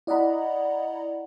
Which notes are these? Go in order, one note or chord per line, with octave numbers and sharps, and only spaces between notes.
E4 D5 D#5 F#5 A#5 B5